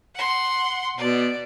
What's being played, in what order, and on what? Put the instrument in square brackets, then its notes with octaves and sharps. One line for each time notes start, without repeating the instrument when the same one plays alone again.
[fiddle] F#5 C6
[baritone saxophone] B2 [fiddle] D5